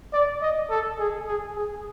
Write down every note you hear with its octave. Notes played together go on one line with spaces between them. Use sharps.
D5
D#5
A4
G#4
G#4
G#4